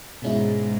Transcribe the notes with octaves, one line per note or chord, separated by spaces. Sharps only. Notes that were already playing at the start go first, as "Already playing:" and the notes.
G#2 B2 G#3 C#4 E4 G#4